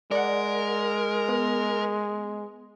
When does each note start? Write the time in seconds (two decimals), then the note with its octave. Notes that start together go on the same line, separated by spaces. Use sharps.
0.11 G#3 A#4 D5 F#5
1.29 B3